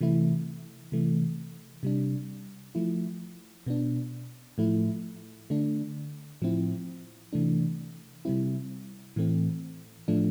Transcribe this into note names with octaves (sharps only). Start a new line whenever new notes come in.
C3 E3 A3 E4
C3 E3 A3
C3 G3 D4
F3 A3 E4
B2 B3 D4
A2 F3 A3 E4
D3 A3 D4
A2 F3 C4 E4
C3 E3 A3 D4
C3 G3 C4 E4
A2 E3 A3 C4
A2 F3 A3 D4